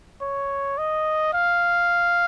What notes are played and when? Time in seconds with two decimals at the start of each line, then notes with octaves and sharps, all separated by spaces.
0.22 C#5
0.78 D#5
1.34 F5